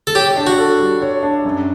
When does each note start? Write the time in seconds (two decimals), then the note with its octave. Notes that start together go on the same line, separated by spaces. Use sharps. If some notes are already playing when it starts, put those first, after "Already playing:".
0.07 A4
0.15 G4 C#5
0.37 D4
0.47 F#4
0.58 A4
0.80 G3
1.02 C#5
1.23 D4
1.45 F#2